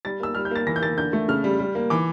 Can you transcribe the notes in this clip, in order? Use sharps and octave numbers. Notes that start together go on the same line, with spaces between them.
G3 A6
A#3 E6
G3 F6
G6
A#3 A6
E3 A#6
G6
A#3 A6
D3 G6
A3
C#3 F6
G3
G3
A#3
E3 D6